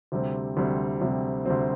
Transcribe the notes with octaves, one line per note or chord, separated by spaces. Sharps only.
D2 C3 G3 C4
D2 C3 G3 C4
D2 C3 G3 C4
D2 C3 G3 C4